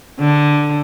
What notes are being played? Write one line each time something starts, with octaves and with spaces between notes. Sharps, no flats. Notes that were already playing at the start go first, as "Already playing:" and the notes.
D3